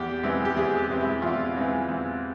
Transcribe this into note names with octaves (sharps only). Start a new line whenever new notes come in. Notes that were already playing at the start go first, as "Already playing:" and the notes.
Already playing: E2 G4
E3 G#3 C4
G4
E2 G#4
G4
E3 G#3 C4
E4
E2 F4
E3 G#3 C4
E2